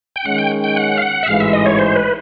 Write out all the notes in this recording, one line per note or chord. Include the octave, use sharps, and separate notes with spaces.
G5
D#3 G#3 C#4 F#5
G5
G5
F#5
F5
F#5
E5
A1 G#2 E3 G#3 F5
E5
D#5
C#5
C5
B4